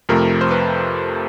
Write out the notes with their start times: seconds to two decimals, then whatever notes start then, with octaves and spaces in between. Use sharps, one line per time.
0.09 F2 C3 F3 A3 A#4
0.41 C5
0.51 B4